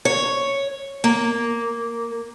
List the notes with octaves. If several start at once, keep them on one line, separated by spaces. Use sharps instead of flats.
C#5
A#3